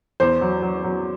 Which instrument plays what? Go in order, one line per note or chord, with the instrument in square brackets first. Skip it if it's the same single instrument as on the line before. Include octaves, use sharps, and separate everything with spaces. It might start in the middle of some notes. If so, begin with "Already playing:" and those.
[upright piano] E2 C5
F#3
F#3
F#3